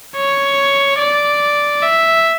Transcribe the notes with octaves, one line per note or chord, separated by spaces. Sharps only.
C#5
D5
E5